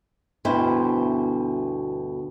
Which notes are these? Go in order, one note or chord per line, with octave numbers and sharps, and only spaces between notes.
D2 G2 B2 E4 C5